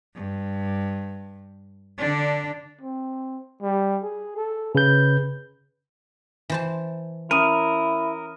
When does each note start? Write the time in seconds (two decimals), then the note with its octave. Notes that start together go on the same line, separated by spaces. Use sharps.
0.15 G2
1.98 D3 D4
2.81 C4
3.62 G3
4.03 G#4
4.37 A4
4.75 C#3 B4 G6
6.50 E3 C5 A5
7.31 C#4 E4 A#4 D#6 D#7